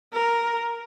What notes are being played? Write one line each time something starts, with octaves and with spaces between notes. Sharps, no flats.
A#4